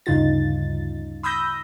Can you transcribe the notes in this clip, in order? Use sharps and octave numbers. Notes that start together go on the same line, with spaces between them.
D2 G2 C#3 D#4 F4 A6
B5 D#6 E6 G6 A#6